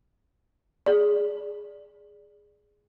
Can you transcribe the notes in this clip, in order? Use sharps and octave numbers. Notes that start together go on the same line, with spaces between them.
G#4 D5